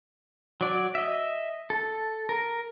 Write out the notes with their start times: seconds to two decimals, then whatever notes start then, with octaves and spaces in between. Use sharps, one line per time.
0.61 F#3 D5
0.95 D#5 E5
1.70 A4
2.29 A#4